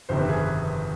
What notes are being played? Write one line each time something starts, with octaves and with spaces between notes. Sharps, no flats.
G1 F2 C3 D#3 C5
B4
G#4
B4